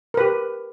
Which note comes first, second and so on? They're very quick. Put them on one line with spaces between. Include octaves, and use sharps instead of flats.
A#4 B4 G4